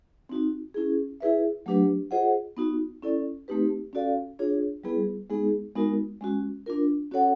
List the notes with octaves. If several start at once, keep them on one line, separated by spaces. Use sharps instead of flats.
C4 D#4 F#4
C#4 E4 G#4
E4 G#4 B4 E5
F#3 A3 D4 G4 B4
F4 G#4 C5 D#5 F#5
B3 D#4 F#4
C#4 E4 A4 D5
A3 C4 D#4 G4 B4
C#4 F#4 A4 D5 F5
D4 F4 G#4 C#5
G3 B3 E4 G#4 B4
G#3 B3 D#4 G#4
G#3 B3 D#4 F#4 A#4
G#3 C#4 F#4
D4 F4 A#4
C#4 F#4 A4 C#5 F#5